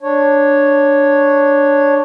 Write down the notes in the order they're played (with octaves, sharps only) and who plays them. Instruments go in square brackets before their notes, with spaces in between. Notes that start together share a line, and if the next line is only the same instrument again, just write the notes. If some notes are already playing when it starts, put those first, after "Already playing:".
[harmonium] D4 C#5